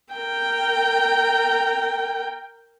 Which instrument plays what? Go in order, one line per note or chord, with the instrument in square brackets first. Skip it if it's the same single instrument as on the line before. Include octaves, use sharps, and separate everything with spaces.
[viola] A#4 G5